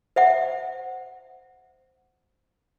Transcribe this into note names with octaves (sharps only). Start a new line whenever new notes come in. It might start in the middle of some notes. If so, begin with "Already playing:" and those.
C5 E5 F#5